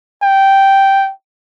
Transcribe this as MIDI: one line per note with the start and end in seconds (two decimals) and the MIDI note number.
0.22 1.11 79